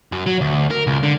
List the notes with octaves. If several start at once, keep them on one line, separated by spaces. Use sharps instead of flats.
F#2
F#3
D2
A#4
C#2
D3